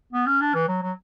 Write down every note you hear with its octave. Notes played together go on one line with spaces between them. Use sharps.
B3
C#4
D4
E3
F#3
F#3